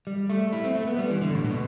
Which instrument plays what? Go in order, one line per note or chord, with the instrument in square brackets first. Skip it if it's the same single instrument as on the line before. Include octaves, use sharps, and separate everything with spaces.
[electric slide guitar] G3
A3
E4
C4
A3
B3
G3
E3
D3
A2
B2